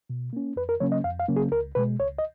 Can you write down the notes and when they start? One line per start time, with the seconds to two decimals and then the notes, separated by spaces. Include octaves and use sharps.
0.10 B2
0.33 A#3 C#4
0.56 F2 B4
0.69 A#4
0.80 C#3 F#3 A#3 C#4 C#5
0.92 D#5
1.04 F2 F5
1.20 F5
1.29 C#3 F#3 A#3 C#4
1.36 G#4
1.51 C#2 A#4
1.75 B2 G#3 B4
1.99 C#2 C#5
2.19 D#5